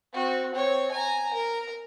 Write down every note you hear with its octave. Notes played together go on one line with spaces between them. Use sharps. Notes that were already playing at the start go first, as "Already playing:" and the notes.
C4 F#4
C4 C#5
G#5 A#5
A#4